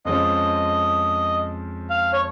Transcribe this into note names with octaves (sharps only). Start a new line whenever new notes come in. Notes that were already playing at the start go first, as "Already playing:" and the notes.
F2 F3 G#3 C#4 D#5
F5
C#5